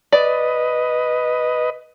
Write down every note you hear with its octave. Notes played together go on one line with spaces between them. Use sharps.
B4 D5 D#5